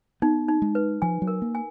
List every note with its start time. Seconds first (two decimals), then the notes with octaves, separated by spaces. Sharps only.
0.22 B3 D#4
0.48 D#4
0.62 G#3
0.75 B4
1.02 F3 G#5
1.22 F#3
1.27 A#4
1.42 A#3
1.55 G#5